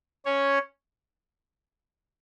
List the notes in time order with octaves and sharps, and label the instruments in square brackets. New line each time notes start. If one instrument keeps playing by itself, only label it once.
[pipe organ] C#4 C#5